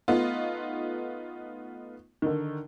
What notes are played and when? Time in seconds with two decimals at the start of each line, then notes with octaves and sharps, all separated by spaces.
0.08 A3 B3 D#4 F4
2.22 D3 D#3